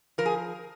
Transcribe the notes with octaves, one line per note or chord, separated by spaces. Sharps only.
F3 A#4
G#4